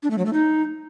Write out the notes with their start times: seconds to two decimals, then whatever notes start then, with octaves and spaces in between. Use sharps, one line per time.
0.03 D4
0.11 A3
0.18 F#3
0.26 A3
0.33 D#4